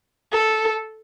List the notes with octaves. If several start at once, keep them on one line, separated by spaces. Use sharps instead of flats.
A4